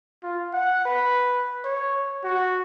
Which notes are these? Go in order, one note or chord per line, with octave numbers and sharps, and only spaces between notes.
F4
F#5
B4
C#5
F#4